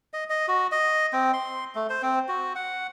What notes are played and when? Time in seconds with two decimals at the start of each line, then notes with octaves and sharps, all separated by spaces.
0.14 D#5
0.30 D#5
0.48 F#4
0.72 D#5
1.13 C4
1.33 C6
1.75 A3
1.90 C5
2.02 C4
2.28 F#4
2.56 F#5